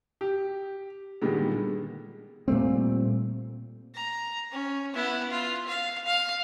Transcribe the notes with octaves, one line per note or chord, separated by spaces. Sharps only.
G4
A#2 D3 D#3 G3 G#3 B3
A#2 G3 A3 C4
A#5
C#4
B3 E4
F4
F5
F5